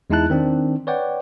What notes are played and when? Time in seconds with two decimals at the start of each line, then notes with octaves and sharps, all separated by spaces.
0.10 E2 G#3 D#4 E4 A5 F#6
0.30 D#3 C4 D4
0.87 B4 C#5 D5 F#5 G5